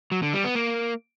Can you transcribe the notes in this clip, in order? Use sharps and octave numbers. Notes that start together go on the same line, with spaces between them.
F#3
D3
G3
B3
A#3